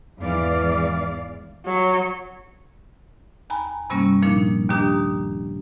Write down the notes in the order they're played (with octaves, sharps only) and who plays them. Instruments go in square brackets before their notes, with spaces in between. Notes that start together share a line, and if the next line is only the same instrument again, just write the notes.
[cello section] E2 G#2 E3 D5 F5
[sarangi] F#3
[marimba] D#2 G#5 A#5 B5
G2 C3 G3 A#3 C#4
A#2 F3 A#3 D4 D#4
D#2 D#3 D4 G4 A#5 D#6